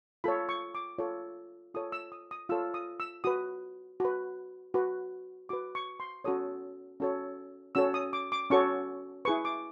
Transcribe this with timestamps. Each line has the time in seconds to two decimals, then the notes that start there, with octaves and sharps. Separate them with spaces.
0.24 F4 A4 C#5 B5
0.49 C#6
0.75 D6
0.98 F4 A4 C#5
1.74 F4 A4 C#5 D#6
1.92 E6
2.12 D#6
2.31 D#6
2.49 F4 A4 C#5 E6
2.74 D#6
3.00 E6
3.24 F#4 B4 D#6
4.00 F#4 B4
4.74 F#4 B4
5.49 F#4 B4 D6
5.75 C#6
6.00 C6
6.24 C#4 F#4 A4 C#5 D#6
7.00 C#4 F#4 A4 C#5
7.75 C#4 F#4 A4 C#5 E6
7.94 D#6
8.13 D6
8.32 D6
8.50 C#4 F#4 A4 C#5 C#6
9.25 E4 G#4 B4 C#6
9.45 D6